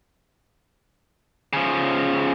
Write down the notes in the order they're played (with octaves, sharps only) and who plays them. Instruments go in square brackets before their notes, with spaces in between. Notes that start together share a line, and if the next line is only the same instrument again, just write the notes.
[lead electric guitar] C#3 F3